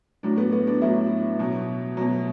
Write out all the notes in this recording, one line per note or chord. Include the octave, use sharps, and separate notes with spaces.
A2 F#3 D4
B3
B3
D4
A2 F#3 E4
B2 F#3
B2 F#3